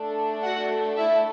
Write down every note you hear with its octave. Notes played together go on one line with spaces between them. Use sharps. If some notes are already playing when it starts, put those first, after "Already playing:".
Already playing: A3 D4 A4
F#4 F#5
E4 E5